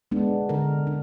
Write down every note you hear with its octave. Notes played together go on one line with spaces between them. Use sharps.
G#3 B3 D4
D3 A#4
D4